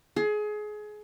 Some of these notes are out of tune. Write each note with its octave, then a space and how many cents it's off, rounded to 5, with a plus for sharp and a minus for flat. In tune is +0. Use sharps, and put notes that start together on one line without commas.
G#4 +25